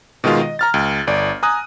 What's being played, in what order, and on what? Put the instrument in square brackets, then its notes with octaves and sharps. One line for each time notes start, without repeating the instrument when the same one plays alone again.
[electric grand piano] B2 D#3 G#3 F4 F5
D#5
A#5 F6 A6
C#2
G1 D5
G#5 A#5 D#6 F#6